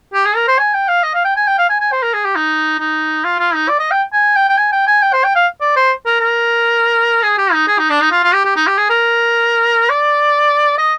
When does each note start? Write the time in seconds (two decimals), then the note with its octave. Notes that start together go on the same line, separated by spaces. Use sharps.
0.14 G4
0.26 G#4
0.36 A#4
0.48 C5
0.58 G#5
0.74 G5
0.88 F5
1.03 D#5
1.14 F5
1.25 G5
1.36 G#5
1.47 G5
1.58 F5
1.69 G#5
1.80 G#5
1.92 C5
2.03 A#4
2.13 G#4
2.25 G4
2.36 D#4
2.79 D#4
3.24 F4
3.39 F4
3.54 D#4
3.69 D5
3.79 D#5
3.91 G5
4.13 G#5
4.36 G5
4.49 G5
4.57 G#5
4.72 G5
4.87 G#5
5.02 G5
5.13 C5
5.24 G5
5.35 F5
5.61 D5
5.76 C5
6.05 A#4
6.20 A#4
7.23 G#4
7.38 G4
7.52 D#4
7.68 G#4
7.79 D#4
7.90 D4
8.01 D#4
8.11 F4
8.23 F4
8.34 G4
8.45 G4
8.56 D#4
8.67 G4
8.78 G#4
8.90 A#4
9.89 D5
10.78 D#5